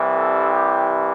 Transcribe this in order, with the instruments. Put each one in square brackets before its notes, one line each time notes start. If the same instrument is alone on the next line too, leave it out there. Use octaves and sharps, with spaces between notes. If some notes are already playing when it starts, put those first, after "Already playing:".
Already playing: [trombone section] C2 C3 E3 G3
A4
G4